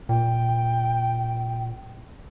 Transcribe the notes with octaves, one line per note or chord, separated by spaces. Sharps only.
A#2 G5